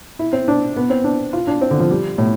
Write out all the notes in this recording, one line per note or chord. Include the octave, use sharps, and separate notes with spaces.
E4
C4
D4
B3
C4
D4
F4
D4
C4
D3
F3
G3
A2